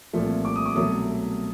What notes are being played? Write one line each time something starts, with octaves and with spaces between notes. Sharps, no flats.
C2 A#2 F3 A3
D6
D#6
D6
C2 B2 F#3 A3 D#6